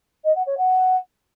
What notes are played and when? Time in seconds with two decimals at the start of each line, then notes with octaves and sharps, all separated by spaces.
0.24 D#5
0.35 F#5
0.47 C#5
0.58 F#5